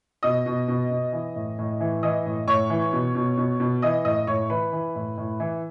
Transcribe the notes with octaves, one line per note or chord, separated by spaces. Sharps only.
B2 D#5 D#6
B2
B2
B2
E3
A2
A2
E3
E3 D#5 D#6
A2
A2 C#5 C#6
E3
B2
B2
B2
B2
E3 D#5 D#6
A2 D#5 D#6
A2 C#5 C#6
E3 B4 B5
E3
A2
A2
E3